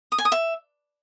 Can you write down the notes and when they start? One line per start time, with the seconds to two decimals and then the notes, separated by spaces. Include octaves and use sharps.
0.12 D#6
0.18 G#5
0.25 D#6
0.32 E5